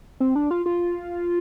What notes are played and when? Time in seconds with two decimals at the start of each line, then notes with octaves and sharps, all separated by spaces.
0.20 C4
0.36 D4
0.51 F4
0.66 F4